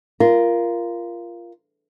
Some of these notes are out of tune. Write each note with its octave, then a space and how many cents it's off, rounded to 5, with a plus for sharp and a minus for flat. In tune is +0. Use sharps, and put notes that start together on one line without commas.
F4 -15 A#4 +10